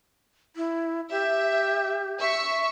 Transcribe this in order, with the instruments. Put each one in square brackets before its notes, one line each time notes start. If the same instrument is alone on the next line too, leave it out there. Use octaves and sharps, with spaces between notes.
[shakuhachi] E4
[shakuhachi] G4 [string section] E5
[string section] E5 C#6